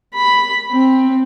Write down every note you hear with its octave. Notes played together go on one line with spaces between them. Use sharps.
B5
C4